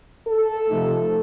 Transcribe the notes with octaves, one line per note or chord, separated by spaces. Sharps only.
A4
C3 F3 A3 D#4